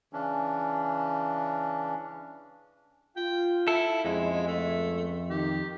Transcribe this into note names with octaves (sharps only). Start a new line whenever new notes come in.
C#3 E3 C#4 D4
F4 G5
E4 A4
A#1 F2 C#3 G#3 E4
C#2 A3
D#3 G4